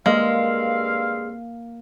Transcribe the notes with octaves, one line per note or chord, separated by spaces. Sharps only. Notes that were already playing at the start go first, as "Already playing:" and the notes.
G2 G#3 A#3 C4 F5